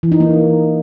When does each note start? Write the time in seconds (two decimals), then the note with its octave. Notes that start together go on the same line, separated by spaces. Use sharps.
0.03 E3
0.12 D#4
0.20 A#3